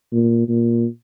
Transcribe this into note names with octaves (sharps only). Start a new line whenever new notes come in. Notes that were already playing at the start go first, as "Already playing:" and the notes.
A#2
A#2